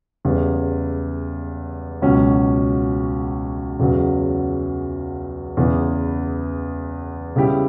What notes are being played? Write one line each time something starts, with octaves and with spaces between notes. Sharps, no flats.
E2 C#3 G3
C#2 B2 F#3 C#4
E2 C#3 F#3
E2 C#3 E3 B3
C#3 G3 B3 E4 G4